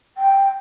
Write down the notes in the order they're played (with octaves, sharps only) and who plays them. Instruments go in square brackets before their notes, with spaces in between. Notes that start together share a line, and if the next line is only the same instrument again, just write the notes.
[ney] G5